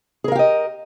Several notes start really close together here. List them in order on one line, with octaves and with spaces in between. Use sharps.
G#4 A#4 F5 G4 D#5